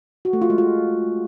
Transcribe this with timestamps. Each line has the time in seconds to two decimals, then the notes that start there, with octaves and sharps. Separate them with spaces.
0.25 F#4
0.33 A3
0.42 F4
0.50 G#3
0.58 F4